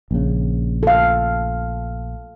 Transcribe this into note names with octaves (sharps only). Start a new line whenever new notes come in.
A#1 C#3
A4 F5